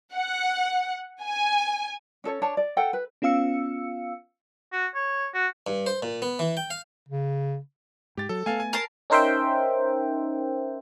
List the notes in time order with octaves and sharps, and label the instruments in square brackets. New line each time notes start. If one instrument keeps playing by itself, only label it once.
[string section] F#5
G#5
[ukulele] C#4 A4 C#5
D4 C#5 A5
D5
A4 F#5 G5
B4
[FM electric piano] B3 C#4 F4 F5 E6 C#7
[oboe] F#4
C#5
F#4
[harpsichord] G2
C5
A#2
B3
E3
G5
F5
[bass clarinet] C#3
[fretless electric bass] G#2 [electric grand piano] G4 A6
[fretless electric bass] F#3 [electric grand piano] A4
[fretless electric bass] A3 B3 [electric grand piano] A4 F5 G#5
[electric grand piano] G#5
[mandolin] A#4 A5 C6
[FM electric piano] C#4 D#4 A#4 C5 E5 G5